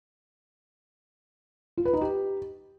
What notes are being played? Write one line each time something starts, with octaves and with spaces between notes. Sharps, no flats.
F4
B4
D#4
G4